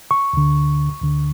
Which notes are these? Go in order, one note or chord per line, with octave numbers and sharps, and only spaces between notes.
C#6
D2 D3
D2 D3